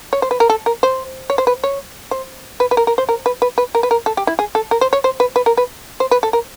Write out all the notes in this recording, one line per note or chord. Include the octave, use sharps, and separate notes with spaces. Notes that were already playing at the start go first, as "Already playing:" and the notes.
C#5
C5
B4
A#4
A4
A#4
C5
C#5
C5
B4
C#5
C5
B4
B4
A#4
A#4
C5
A#4
B4
B4
B4
A#4
B4
A#4
A4
G4
E4
G#4
A4
A#4
C5
C#5
C5
B4
B4
A#4
B4
C5
B4
A4
A#4